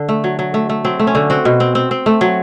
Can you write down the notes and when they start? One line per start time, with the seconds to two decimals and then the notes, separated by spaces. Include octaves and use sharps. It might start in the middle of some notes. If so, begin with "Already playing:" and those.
Already playing: D3
0.09 A3
0.24 F#3
0.39 F#3
0.54 A3
0.69 A3
0.85 F#3 C4
0.99 A3
1.07 C#4
1.15 D3
1.30 C4 F#4
1.45 B2
1.60 C4
1.75 C4
1.91 C4
2.06 A3
2.21 F#3